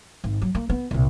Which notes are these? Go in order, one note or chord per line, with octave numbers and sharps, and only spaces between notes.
G#1
F#3
A#3
B3
C2 A#2